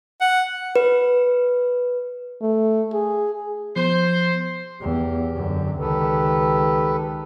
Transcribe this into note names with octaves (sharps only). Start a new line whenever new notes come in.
F#5
B4
A3
G#4
F3 B3 C5
E2 G4
F#2 D3
C#2 D#3 G4 A4 B4